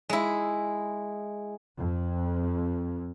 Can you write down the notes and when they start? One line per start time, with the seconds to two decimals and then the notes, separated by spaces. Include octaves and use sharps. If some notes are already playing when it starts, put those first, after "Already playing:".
0.10 G#3 E4
1.79 F2